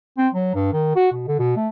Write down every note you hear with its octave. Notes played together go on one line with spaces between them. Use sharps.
C4
F#3
G2
D#3
F#4
B2
D3
B2
A3